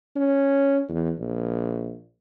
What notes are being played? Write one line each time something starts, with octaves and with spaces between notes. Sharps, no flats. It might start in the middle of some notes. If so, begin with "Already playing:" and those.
C#4
E2
A#1